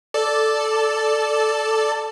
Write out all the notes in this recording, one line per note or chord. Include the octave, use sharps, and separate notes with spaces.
A4 D5 A5